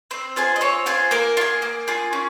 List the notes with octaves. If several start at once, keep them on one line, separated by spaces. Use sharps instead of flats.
C4 C5
F4 G#4 C5
D#5
C4 C#5
F4 G#4 C5
A#3 A#4
F4
G#4
A#3
F4 G#4
C#4